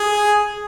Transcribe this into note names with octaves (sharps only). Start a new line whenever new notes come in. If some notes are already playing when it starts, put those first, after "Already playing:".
Already playing: G#4